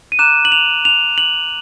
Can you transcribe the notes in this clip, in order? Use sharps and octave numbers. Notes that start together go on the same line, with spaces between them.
D#7
A#5 D6 F#6 E7
F#7
F7
F7
F#7